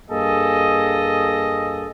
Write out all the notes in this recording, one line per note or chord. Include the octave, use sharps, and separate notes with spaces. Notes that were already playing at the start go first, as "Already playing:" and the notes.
G2 A#3 G#4 A4 D#5